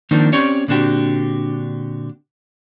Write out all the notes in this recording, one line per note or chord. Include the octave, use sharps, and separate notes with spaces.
D#3 F3 A#3 C4 D4 D#4
C4 C#4 G4 C#5 D5
A#2 D3 C4 D4 F#4 G4